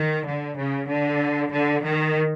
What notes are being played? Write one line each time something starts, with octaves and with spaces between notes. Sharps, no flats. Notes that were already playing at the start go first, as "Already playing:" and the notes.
Already playing: D#3
D3
C#3
D3
D3
D#3